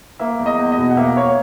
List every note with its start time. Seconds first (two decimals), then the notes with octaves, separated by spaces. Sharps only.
0.19 A#3 E5
0.39 E2
0.46 D#5
0.59 E2
0.72 D#5
0.78 B2
0.90 F#5
0.97 A#3 E5
1.17 A#3 C#5